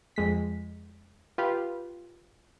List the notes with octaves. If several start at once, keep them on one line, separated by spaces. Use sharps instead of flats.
F2 G#3 B6
F4 G4 B4 F5